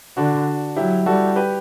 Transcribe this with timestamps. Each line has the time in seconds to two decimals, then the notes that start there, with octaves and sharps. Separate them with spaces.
0.17 D3 D4 F#4
0.76 F#3 E4 G4
1.06 G3 F#4 A4
1.36 G4 B4